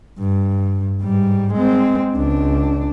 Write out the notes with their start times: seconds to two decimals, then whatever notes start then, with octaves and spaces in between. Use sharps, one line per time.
0.19 G2
1.01 G#2 G3
1.53 G#3 C4
2.16 C#2 D4